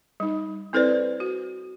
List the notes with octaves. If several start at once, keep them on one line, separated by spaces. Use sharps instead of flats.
G3 D#4
C4 E4 A4 B4 C5 D5
F#4